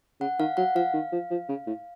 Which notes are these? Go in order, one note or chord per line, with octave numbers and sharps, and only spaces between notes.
C#3 F#5
D#3 F5
F#3 F#5
F3 F5
D#3
F3
F3
C#3
A2